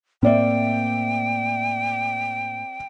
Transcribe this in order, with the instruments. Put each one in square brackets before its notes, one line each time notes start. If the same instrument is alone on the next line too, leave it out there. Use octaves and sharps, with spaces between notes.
[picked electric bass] A2 A#3 [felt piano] C4 D5 E5 [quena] G5